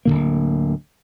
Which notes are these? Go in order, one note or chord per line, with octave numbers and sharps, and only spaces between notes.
D1 F#2 D3 A#3